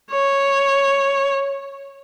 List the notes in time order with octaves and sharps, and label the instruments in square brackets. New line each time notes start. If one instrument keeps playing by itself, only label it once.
[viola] C#5